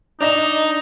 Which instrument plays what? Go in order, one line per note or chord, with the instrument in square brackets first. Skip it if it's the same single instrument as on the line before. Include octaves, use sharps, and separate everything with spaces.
[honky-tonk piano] D4 D#5 E7 [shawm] D#4 [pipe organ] A#5